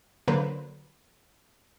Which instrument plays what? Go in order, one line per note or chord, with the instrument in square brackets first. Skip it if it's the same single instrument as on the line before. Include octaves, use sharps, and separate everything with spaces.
[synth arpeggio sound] D3 F#3 A#3 B4 C5